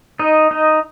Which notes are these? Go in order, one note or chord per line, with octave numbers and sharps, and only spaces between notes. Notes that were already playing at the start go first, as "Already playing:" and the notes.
D#4 D#5
D#4 D#5